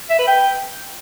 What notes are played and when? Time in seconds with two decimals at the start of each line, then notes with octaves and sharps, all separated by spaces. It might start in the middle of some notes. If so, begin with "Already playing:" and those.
0.10 E5
0.19 B4
0.28 G5